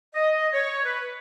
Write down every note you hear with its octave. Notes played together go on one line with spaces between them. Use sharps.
D#5
C#5
B4